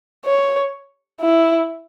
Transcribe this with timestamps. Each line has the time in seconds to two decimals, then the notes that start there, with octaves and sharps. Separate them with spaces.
0.25 C#5
1.20 E4